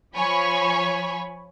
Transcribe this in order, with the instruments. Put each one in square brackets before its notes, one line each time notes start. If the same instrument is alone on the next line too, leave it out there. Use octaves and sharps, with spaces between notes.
[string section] F3 C#5 G#5 B5 C#6